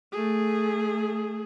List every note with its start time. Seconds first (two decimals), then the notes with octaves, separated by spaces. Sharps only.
0.12 A3 G#4